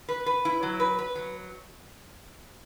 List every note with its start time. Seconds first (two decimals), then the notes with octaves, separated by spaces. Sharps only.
0.09 B4
0.26 B4
0.45 E4
0.63 F#3
0.80 B4
0.99 B4
1.15 F#3